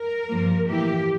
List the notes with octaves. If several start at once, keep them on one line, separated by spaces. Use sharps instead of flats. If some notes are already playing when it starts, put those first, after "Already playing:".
Already playing: A#4
G2 F3 A#3
A2 E3 A#3 E4 G4